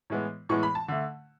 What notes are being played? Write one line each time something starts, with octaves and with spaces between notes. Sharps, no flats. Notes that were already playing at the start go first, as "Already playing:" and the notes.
A2 E3 G#3 B3
A2 E3 G#3 B3 C#6
B5
A5
D3 A3